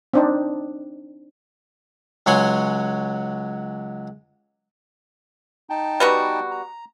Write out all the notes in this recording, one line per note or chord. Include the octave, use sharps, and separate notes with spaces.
C4 D4 D#4
C#2 F#3 C#5 F#5 G#5 C6
D#4 G5 A5
G3 B3 F#4
A#5